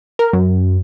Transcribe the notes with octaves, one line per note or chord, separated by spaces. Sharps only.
A#4
F#2